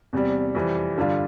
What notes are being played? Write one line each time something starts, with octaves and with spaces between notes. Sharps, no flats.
E2 C3 G3
F2 C3 E3 G3
G2 D3 G3 D4 F4